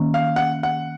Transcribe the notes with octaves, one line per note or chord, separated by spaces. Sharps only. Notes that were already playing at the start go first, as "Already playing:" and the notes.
Already playing: D#3 A#3 C#4
F5
F#5
F#5